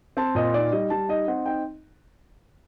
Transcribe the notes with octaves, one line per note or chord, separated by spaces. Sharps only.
C4 A5
A#2 D#5
D#4 D5
G3 D#5
G3 A5
D#4 D#5
C4 F#5
D#4 G5